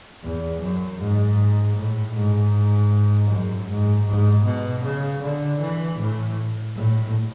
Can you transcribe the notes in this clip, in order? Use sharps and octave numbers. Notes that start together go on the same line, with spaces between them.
E2
F#2
G#2
A2
G#2
F#2
G#2
G#2
B2
C#3
D3
E3
A2
A2